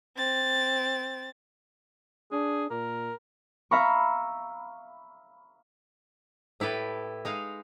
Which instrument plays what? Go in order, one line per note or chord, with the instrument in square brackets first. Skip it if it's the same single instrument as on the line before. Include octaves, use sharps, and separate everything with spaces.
[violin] C4 A6
[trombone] D4 [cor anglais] G#4
[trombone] A#2 [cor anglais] A#4
[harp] E5 F5 A#5 B5 C#6
[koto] A2 E4 G4 A4 B4
G#3 D#4 F5